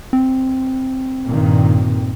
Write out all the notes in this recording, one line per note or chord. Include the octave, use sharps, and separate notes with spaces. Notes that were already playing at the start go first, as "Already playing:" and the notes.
C4
G2 A#2 D#3